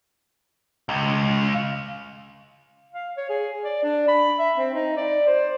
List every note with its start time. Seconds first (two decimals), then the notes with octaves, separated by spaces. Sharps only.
0.89 C#2
2.92 F5
3.17 C#5
3.29 G#4
3.63 D5
3.83 D4
4.08 B5
4.38 E5
4.58 C4
4.74 D#4
4.97 D5
5.27 C5